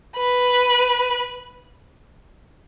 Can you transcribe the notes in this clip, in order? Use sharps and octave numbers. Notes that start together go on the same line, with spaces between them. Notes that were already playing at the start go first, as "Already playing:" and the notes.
B4